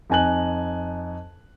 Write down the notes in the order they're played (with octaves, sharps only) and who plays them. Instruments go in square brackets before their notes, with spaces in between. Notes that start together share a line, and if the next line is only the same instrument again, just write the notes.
[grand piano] F2 D#4 G#5 F#6 F#7